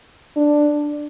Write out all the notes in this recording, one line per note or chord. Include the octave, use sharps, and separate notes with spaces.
D4